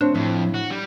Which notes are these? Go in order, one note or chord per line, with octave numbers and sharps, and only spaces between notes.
D2 C4 D4 C#5
F2 A2 E5
F#4
G3